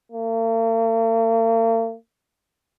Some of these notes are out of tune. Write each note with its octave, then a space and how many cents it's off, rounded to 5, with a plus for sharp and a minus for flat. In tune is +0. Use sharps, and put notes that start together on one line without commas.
A#3 -45